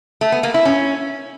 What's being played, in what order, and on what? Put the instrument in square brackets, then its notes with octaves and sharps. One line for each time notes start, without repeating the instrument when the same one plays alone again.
[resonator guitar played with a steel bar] A3
B3
A#3
E4
C#4